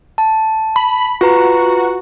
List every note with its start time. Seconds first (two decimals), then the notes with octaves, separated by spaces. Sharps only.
0.18 A5
0.76 B5
1.21 F4 F#4 B4 A#5